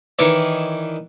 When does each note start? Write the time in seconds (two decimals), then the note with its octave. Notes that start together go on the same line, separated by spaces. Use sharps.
0.19 D#3 E3 C#5 D5